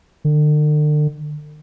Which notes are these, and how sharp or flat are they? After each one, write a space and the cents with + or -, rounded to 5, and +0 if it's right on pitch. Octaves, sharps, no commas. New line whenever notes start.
D3 +40